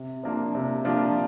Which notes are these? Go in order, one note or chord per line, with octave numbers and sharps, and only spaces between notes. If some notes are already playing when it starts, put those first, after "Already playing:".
Already playing: C3
F3 A#3 D4 F4
C3
F3 A#3 D4 F4